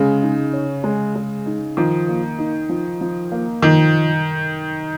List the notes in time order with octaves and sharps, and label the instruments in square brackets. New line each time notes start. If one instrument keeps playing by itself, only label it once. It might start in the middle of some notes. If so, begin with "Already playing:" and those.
Already playing: [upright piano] C#3 [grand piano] G#3
[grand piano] D#4
C#5
G#3
G#3
D#4
[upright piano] D#3 [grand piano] F3
[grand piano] A#3
D#4
F3
F3
A#3
[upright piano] D#3 [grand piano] F3